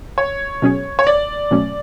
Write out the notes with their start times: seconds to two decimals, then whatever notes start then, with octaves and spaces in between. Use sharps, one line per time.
0.18 C#5
0.62 B2 F#3 C#4 G#4
0.99 C#5
1.07 D5
1.51 B2 F#3 A3 C#4